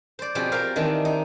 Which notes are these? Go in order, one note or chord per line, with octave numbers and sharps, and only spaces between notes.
C5 D5
B2 F3 C4 G4 G#4
G4 A#4 C5 F5
D#3 E3 C4 D4
D#4